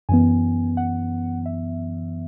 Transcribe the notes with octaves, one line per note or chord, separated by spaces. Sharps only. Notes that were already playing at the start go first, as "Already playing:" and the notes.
F#2 E3 B3 G#5
F#5
E5